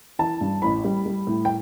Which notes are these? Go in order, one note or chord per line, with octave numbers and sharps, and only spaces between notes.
E3 A5
G2
A1 B5
G3
G3
A2
G5